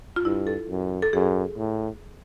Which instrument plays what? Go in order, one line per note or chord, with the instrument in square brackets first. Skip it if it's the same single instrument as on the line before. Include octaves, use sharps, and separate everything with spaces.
[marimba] F4
[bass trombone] G2 [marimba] E4
[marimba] A4
[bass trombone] F#2
[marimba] A4
[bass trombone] F#2 [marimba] G#4
[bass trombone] A2